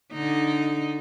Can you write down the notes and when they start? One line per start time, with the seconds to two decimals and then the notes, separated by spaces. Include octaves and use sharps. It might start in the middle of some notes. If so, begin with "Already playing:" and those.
0.13 D3 D#4